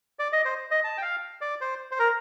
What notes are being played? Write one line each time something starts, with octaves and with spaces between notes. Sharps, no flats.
D5
D#5
C5
D#5
A5
G5
F5
D5
C5
C5
A#4